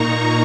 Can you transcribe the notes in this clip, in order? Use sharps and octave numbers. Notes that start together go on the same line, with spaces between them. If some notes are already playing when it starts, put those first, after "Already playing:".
Already playing: A#2 A#3 D#4 A#5 C#6